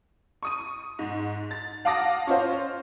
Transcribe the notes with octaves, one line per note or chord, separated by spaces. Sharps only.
C#6 D#6 D#7
G#2
A6
F5 F#5 A5 D6 D#6 A#6
C#4 F4 C5